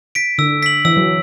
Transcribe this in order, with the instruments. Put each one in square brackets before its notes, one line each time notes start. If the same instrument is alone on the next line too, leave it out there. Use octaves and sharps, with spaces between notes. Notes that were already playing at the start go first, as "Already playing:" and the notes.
[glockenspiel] B6 D7
[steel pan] D3 [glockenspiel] E6
[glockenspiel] B6 F#7
[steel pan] E3 [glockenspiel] E6
[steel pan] F#3